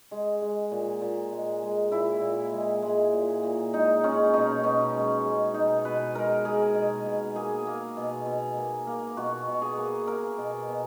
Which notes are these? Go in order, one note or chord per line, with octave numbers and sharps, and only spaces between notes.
G#3
G#3
A#2
A#2
G#3
G#3
A#2 E4
A#2
G#3
G#3
A#2
A#2
G#3 D#4
G#3 C#4
B2 D#4
B2 C#4
G#3
G#3
B2 D#4
B2 B4
G#3 A#4
G#3 G#4
B2
B2
A#3 G#4
A#3
B2
B2
A#3
A#3
B2 F#4
B2
G#4
A#3
A#3 A#4
B2
B2